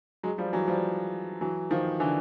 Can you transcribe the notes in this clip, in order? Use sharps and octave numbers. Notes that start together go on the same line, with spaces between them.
F#3 G#3
F3 G3
E3 F#3
F3 G3
E3 F#3
D#3 F3
D3 E3